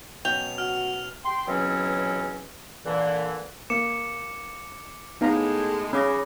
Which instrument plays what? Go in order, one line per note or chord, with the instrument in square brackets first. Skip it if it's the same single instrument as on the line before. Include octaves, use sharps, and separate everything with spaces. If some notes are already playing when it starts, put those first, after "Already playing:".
[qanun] B2 F#3 C#4 [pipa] G5 [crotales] F7
[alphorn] F#4 [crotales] F6
[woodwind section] G5 C6
C#2 B2 E3 F#3 C4 C#4
A#2 D3 E3
[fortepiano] A#3 [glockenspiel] D6 C#7 E7
[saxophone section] A2 G#3 [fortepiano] B3 [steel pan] D#4 F5 A#5
[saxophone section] C#3 [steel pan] C#4 [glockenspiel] B5 D6 A#6